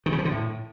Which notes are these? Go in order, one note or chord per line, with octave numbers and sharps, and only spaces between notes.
D#3
C#3
F3
D3
A2